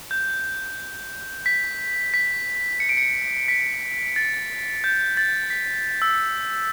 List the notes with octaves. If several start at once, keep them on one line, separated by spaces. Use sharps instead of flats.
G6
B6
B6
C#7
D7
C#7
B6
A6
G6
A6
B6
E6